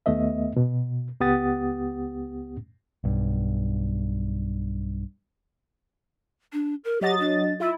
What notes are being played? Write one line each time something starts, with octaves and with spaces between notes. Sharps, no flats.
D#2 A3 B3 D#5 E5
B2
C#2 B3 G4 F#5 D#6 A6
B1 G2
D4
A#4
F#3 G4 D#5 A6
D4
E4 F4